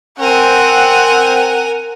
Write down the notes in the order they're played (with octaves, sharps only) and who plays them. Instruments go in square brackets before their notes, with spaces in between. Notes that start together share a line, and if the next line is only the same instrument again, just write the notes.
[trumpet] C4 [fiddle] A#4 G#5 [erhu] F#5